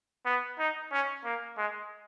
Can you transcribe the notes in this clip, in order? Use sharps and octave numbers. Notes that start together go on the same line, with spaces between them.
B3
D#4
C#4
A#3
G#3